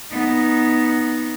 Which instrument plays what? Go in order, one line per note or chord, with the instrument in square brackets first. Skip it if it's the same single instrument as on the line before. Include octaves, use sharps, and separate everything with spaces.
[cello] B3 D#4